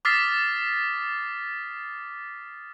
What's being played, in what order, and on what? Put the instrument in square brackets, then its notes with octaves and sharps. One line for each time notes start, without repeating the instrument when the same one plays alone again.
[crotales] D6 D#6 F6 A6 B6 C7